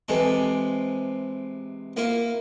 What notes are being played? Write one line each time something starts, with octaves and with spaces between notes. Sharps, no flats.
C3 E3 G#3 A4
A#3 E4 F4